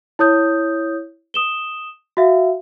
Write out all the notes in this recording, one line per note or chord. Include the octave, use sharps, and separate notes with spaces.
E4 C#5 D#6 G6
D#6 E7 G7
F#4 E5 F5